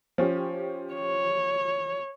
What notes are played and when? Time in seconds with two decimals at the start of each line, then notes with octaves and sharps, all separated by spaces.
0.18 F3 C#4 G4
0.94 C#5